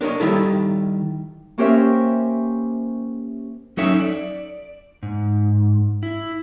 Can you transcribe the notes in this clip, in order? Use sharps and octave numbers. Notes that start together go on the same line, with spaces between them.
D4 A#4 C#5 D#5
D#3 G3 E4 A4
A#3 C#4 G4 A#4 C5 E5
F#3 C#4 D#4 A4 C#5 E5
D5
G#2
E4